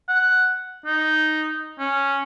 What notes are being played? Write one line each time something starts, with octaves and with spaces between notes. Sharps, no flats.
F#5
D#4
C#4